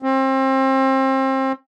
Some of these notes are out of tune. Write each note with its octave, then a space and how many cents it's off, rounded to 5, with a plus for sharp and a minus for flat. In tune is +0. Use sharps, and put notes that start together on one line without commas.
C4 +30